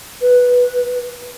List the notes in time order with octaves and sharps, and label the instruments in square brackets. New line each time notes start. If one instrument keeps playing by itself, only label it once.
[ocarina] B4